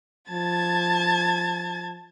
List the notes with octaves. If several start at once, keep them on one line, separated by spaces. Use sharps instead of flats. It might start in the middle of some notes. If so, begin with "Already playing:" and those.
F3 A5 G#6 A6